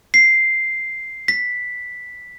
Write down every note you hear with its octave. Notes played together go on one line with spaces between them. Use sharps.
C7
B6